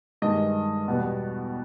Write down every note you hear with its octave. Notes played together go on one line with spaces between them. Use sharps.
G2 D#3 G#3 D#5
E2 B2 G3 B3